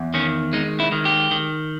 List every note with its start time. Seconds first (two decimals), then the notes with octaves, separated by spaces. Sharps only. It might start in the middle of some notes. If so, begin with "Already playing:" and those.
Already playing: E2
0.14 D#3 C#4
0.53 G#3 D#4
0.80 E4
0.92 D#3
1.05 G4
1.31 D#3